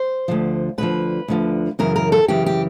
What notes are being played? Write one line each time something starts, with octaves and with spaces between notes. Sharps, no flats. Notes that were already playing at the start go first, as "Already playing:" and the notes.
Already playing: C5
D2 D3 F3
D2 D3 F3 B4
D2 D3 F3
F#2 C#3 E3 A#4
A#4
A4
F#2 C#3 E3 G4
G4